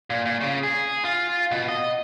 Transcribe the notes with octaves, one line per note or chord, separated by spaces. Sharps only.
A#2
A#2
C#3
G#4
F4
B2
D#5